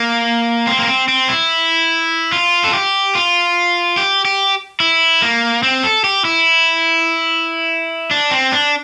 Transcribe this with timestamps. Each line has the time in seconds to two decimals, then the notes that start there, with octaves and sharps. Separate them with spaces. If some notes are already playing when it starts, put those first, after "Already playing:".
Already playing: A#3
0.67 C4
0.79 A#3
0.87 C4
1.08 C4
1.29 E4
2.32 F4
2.64 A4
2.73 G4
3.15 F4
3.97 G4
4.25 G4
4.80 E4
5.22 A#3
5.63 C4
5.83 A4
6.04 G4
6.25 E4
8.11 D4
8.31 C4
8.52 D4